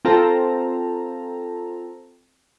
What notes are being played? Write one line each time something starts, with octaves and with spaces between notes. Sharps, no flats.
C4 F4 A4 A5 A#5